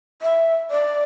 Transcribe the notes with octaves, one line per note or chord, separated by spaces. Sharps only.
E5
D5